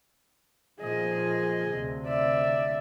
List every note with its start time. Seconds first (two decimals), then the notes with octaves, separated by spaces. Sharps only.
0.80 A#2 F3 G#4 D#5
1.69 D2 C3
2.07 D5 E5